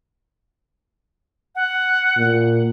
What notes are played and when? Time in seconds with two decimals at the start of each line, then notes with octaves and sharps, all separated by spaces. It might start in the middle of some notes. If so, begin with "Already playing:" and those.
1.55 F#5
2.17 A#2